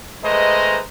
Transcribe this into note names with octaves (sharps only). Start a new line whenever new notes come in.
G#3 A3 B4 C5 D#5 A#5